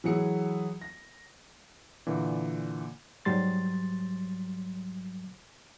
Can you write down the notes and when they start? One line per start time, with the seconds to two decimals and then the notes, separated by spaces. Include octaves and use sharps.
0.04 E3 F#3 G#4 C#7
0.81 A#6
2.07 A#2 D3 E3
3.25 G#2 F#3 G3 C6 A6